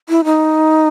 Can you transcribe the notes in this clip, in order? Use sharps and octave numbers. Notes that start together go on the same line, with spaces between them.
E4
D#4